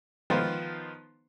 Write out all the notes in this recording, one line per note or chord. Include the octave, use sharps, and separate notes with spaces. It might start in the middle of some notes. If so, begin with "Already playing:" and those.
D#3 F3 B3 D#4 F4 C5